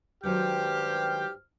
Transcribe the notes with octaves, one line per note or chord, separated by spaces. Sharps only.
G2 D#3 F#3 G#3 G4 C5 G5 F6